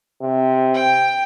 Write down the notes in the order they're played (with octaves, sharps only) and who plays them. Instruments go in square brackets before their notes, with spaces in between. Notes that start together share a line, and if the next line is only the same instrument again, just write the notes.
[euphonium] C3
[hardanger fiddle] G5